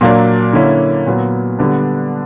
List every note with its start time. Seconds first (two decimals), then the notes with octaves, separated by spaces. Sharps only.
0.01 A#2 F#3 A#3 D4
0.53 D3 A#3 C#4 E4
1.07 A#2 F#3 B3
1.59 D3 G3 B3 D4